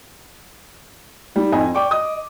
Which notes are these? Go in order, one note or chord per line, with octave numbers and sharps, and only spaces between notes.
G3 D#4
F2 D#5 G#5
D5 G5 C#6 D6
D#5 D#6